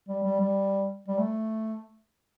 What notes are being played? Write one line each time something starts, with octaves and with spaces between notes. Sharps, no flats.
G3
G3
G3
G3
A3